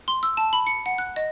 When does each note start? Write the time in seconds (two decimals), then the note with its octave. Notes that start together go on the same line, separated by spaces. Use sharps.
0.08 C6
0.23 E6
0.37 A5
0.53 B5
0.67 C#7
0.86 F#5
0.98 F#6
1.16 D#5